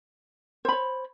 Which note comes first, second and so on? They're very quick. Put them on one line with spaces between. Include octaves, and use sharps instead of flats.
C5 B5 C#5